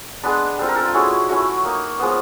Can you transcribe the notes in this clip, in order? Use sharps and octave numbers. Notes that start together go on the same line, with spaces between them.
G#3 B3 D4 B4
G3 C4 F4 A4
A#4
A4
F4
G#3 C#4 E4 F#4
A3 C#4 E4 F#4
A#3 D#4
F3 G#3 B3